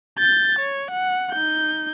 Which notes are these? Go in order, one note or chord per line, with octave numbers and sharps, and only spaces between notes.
G6 A6
C#5
F#5
D#4 G6